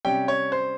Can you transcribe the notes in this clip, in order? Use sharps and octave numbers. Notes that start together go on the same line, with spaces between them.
C3 G3 C#4 G5
C#5
C5